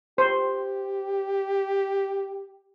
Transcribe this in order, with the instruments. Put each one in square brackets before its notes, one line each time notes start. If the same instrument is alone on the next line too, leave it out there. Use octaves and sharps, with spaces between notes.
[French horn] G4 [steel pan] C5